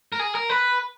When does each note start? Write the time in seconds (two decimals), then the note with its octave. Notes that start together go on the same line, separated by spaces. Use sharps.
0.13 A#4
0.19 G#4
0.35 A#4
0.49 B4